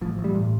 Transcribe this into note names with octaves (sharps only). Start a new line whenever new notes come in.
A1 F3
A1
G3
A2